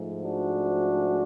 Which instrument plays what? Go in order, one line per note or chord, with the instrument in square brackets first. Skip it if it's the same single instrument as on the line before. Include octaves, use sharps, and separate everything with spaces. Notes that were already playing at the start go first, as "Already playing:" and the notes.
Already playing: [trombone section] G#2 F3 A3
D4 F#4